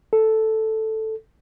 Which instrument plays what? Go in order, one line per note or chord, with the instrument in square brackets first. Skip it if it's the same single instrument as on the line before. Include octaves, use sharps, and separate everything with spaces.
[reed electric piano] A4